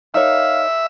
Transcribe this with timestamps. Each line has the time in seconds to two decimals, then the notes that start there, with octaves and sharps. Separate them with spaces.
0.14 D#4 A#4 C#5 E5 F5